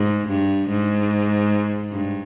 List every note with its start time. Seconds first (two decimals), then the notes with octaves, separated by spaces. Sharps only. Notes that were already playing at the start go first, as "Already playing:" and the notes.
Already playing: G#2
0.29 G2
0.70 G#2
1.93 G2